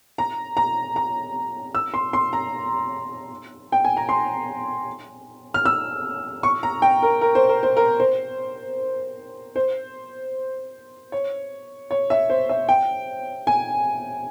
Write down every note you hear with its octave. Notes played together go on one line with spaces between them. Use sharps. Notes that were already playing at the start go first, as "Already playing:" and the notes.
A#5
A#5
A#5
E6
C6
C6
A#5
G5
G#5
A#5
C6
F6
E6
C#6
A#5
G5
A#4
A#4
C5
A#4
C5
A#4
C5
C5
C#5
C#5
E5
C5
E5
G5
G#5